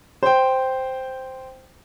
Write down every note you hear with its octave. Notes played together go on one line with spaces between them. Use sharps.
C5 G5